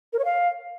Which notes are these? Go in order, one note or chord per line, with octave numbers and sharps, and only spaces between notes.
A#4
C#5
F5